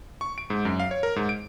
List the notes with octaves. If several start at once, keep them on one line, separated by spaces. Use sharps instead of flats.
C#6
D7
G#2
F#2
F5
C#5
A#4
G#2
D7